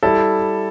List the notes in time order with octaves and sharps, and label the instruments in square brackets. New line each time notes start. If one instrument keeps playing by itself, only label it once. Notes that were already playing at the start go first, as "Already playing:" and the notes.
[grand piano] G3 E4 A4